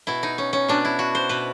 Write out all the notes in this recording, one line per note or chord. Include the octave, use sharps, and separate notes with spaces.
B2 E4
D#4
C#4
C#4
B2 D4
E4
F#4
C5
B2 B4